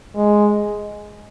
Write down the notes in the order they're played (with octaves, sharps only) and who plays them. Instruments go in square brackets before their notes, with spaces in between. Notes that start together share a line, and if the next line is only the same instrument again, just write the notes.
[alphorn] G#3